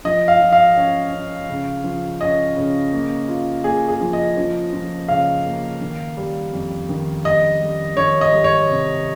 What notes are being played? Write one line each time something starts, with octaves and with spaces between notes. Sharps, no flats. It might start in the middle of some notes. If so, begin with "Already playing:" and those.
F3 D#5
F5
F3
F5
C#4
C#4
C#3
F3
C#4 D#5
C#3
A#3
F4
A#3 G#4
G#4
F3
D#5
F3
F3
C#3 F5
A#3
D#3
G3
F2
D#3
G3 D#5
G3
D#3 C#5
D#5
G3
C#5
C3